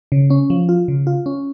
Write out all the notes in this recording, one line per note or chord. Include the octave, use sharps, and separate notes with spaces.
C#3
C#4
F3
F4
C#3
F4
C#4